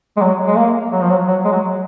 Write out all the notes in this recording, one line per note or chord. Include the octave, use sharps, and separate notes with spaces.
G#3
F#3
G#3
A#3
F#3
F3
F#3
F#3
G#3
F#3